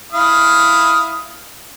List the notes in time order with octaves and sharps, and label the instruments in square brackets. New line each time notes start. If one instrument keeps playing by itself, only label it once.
[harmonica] E4 F5 D#6